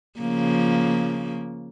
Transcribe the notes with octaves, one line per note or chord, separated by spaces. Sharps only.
C#3 F3 A#3